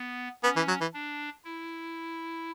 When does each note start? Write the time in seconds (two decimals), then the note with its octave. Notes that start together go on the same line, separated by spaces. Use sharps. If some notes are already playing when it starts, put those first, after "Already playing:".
Already playing: B3
0.43 B3 C#4
0.56 E3
0.68 F#3
0.81 E3
0.94 D4
1.44 E4